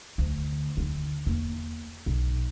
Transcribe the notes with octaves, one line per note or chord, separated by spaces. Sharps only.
D2
D2 D3
E2 A#3
B1